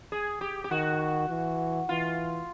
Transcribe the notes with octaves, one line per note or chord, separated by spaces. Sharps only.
G#4
G4
G4
D#3 F#4
E3
E3 F4